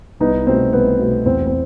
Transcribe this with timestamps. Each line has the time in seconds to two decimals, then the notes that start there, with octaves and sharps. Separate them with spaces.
0.20 C2 B3 D#4
0.46 B2 A3 C4
0.73 C2 B3
0.99 B2 A3
1.26 E2 C4
1.46 C4